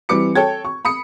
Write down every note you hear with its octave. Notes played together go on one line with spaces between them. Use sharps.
E3 G3 C4 B4 D6 C#7
A4 C#5 G5 G#6
C#6
B5 D#6 C#7